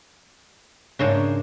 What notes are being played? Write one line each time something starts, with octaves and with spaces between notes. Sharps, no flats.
G#2 C#3 A#3 D4 C#5